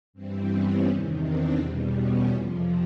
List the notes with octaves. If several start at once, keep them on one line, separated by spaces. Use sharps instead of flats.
G2 E3 G3 C4
B3 C#4
E2 C3 D#3
C4 D4
E2 B2 G3
B3 C#4
F2 C3 F3